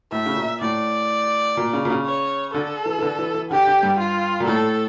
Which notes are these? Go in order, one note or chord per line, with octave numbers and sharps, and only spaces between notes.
A2 E5
C#3
A#2
A2 D5
A#2
C#3
A#2
C#3
C#5
D3 A4
E3
E3
D3
E3
E3
D3 G4
D3
G2
F4
A#2
A2 A4